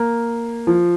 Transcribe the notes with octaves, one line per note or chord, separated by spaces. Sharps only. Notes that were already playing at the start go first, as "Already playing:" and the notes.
Already playing: A#3
F3